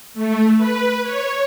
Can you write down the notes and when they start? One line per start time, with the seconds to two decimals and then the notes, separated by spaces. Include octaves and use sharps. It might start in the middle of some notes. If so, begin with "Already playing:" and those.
0.14 A3
0.56 B4
1.02 C#5